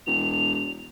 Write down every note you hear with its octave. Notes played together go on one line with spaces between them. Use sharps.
E1 F7